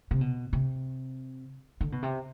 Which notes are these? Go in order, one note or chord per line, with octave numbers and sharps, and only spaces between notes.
C3
B2
C3
D3
B2
C3